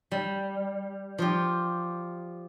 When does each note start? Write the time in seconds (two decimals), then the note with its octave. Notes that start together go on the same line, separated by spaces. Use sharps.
0.11 G3
1.18 F3 F4 G4